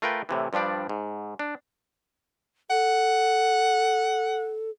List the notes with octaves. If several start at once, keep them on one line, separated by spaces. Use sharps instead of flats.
A3 F4 A#4 B4 G5
A2 C3 E3
G2 F3 G3 D4 D5
G#2
D4
A4 F#5